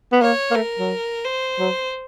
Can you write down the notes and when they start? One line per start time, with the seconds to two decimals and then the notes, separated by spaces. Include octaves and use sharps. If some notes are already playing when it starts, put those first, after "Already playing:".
0.12 B3
0.21 A#3 C#5
0.51 A#3
0.56 A3 A#4
0.79 F#3
1.25 C5
1.59 F#3